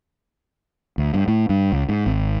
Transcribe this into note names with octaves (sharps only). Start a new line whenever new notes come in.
D2
G2
A2
G2
C#2
G#2
G#1